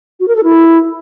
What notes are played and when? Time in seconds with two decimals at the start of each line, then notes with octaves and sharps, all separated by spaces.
0.20 F#4
0.28 A#4
0.36 A4
0.44 E4